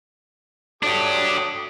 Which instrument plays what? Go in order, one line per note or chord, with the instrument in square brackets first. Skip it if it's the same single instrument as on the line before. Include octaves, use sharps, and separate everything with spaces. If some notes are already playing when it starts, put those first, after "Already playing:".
[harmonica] F#3 A3 D#6 [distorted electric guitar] D4 G4